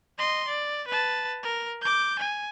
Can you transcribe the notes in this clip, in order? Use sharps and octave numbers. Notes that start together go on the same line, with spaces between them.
D#5 C6
D5
B4 A5
A#4
D6 G6
G#5